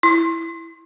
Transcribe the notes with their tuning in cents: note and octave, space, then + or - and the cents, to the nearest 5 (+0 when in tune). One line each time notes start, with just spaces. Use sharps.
E4 +5